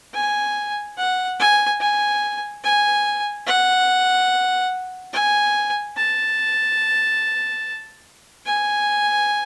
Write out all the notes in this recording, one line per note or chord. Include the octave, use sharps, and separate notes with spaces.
G#5
F#5
G#5
G#5
G#5
F#5
G#5
A5
G#5